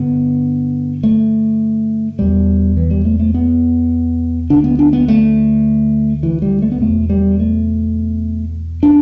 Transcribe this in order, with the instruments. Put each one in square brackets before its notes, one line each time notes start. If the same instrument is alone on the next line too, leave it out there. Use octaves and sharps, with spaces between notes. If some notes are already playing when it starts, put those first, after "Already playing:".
Already playing: [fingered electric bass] G2 D3 B3
A3
E2 B2 G3
E3
G3
A3
A3
B3
D2 D3 D4
B3
D4
B3
A3
E3
G3
A3
B3
E2 B2 A3
G3
A3
D4